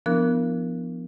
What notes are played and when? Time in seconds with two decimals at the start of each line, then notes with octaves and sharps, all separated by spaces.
0.06 F3 B3 D4 E4 A#4 F#6